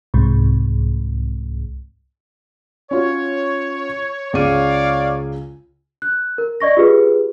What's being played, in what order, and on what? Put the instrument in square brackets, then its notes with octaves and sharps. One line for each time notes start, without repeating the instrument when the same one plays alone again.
[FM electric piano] C2 G#2
[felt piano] C#4 F4 F#4 [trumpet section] C#5
[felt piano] C#2 C#3 D#7 [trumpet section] C#5 D5 F5
[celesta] F#6
A#4
D5 D#5 C#6 A#6
F4 G4 G#4 B4